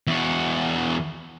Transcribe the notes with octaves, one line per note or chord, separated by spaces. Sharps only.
E2 F#4